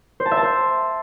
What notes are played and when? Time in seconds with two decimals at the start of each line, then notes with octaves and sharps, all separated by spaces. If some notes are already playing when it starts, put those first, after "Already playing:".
0.20 C5
0.26 A5
0.31 E5
0.37 A5
0.43 C5